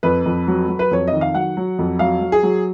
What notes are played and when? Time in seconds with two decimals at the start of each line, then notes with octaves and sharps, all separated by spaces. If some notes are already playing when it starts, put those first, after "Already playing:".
0.03 F2 B4
0.26 F2
0.47 F#3
0.68 F#3
0.79 B4
0.91 F2 C#5
1.07 D#5
1.13 D#3
1.21 F5
1.34 F#3 F#5
1.57 F#3
1.79 F2
1.99 F#3 F5
2.21 F#3
2.32 G#4
2.43 F#3